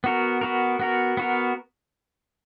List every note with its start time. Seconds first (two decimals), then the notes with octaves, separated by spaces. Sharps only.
0.04 B3 F#4 A#4
0.41 B3 F#4 A#4
0.80 B3 F#4 A#4
1.17 B3 F#4 A#4